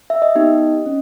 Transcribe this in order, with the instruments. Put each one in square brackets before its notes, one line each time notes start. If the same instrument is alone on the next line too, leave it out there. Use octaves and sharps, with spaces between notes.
[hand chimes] E5
D#5
B3 D#4 G4 D#5
C#4